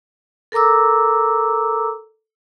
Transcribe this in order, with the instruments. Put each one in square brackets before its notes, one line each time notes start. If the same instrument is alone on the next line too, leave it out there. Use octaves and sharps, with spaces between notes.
[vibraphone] A4 A#4 A#5 D6 E6